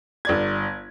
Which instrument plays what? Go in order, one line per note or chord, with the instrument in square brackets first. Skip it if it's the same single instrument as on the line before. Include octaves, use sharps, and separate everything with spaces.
[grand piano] G1 D5 G#6